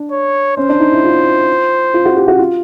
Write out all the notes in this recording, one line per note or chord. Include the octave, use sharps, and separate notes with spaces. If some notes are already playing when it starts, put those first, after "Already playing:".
Already playing: D4
C#5
C#4 C5
D4
D#4
E4
F4
F4
F#4
G4
F#4
F4